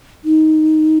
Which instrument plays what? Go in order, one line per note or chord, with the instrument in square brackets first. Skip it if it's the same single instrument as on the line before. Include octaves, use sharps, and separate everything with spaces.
[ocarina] D#4